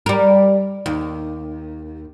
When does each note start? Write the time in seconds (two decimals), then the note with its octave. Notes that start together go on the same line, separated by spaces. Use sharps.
0.06 G3 A#4
0.86 D#2